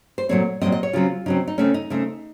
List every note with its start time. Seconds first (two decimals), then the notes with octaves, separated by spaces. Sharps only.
0.18 C5
0.29 A#2 F#3 A3 C4 C#5
0.61 A#2 F#3 A3 C4 D#5
0.72 D#5
0.83 C#5
0.93 C#3 F#3 C4 F4
1.26 C#3 F#3 C4 D#4
1.48 D#4
1.58 C#3 A3 C4 C#4
1.74 D#4
1.90 C#3 A3 C4